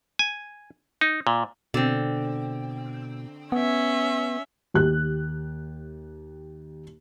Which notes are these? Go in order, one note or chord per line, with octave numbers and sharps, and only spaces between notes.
G#5
D#4
A#2
B2 D3 C4
B3 C#4 E5
D#2 G4 F#6